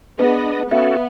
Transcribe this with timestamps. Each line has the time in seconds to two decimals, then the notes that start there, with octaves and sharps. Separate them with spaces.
0.19 B3 D4 G#4 B4 D#5
0.71 B3 C#4 F#4 A4 E5 F5